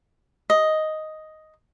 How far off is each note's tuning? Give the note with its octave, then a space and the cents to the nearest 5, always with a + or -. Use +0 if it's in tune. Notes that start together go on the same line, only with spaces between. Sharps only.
D#5 +5